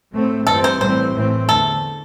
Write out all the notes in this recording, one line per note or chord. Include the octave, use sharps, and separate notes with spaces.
A2 A3 C4
G2 E3 C4 A4
C5
A2 E3 G3 C4 C5
A2 E3 A3 C4
E2 D3 A3 A4